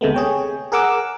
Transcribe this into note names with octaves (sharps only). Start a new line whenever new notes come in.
D2 C3 G#3 A3 B3
G#4 C#5 G5
G#4 A#4 F#5 D6 E6